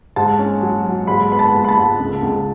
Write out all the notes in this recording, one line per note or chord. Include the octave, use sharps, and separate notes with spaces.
G#2 A5
C#4
F#3
F#3
G#2 B5
B3 B5
A5
G#2
B5
A5
G#2
C#2
C#2